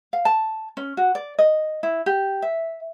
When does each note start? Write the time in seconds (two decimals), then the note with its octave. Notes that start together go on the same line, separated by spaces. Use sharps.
0.13 F5
0.25 A5
0.77 C#4
0.97 F#4
1.15 D5
1.39 D#5
1.83 E4
2.06 G4
2.42 E5